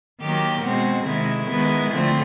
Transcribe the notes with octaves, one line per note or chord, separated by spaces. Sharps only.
D#3 F#3 A#3 G4
B2 G#3 C4 F#4
C3 D#3 G#3 E4
D#3 G#3 B3
D3 F3 A3 C4